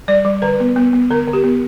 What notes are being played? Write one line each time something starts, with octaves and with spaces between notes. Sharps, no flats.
G3 D5
G3
D3 B4
B3
B3
B3
D3 A#4
D3
G4
B3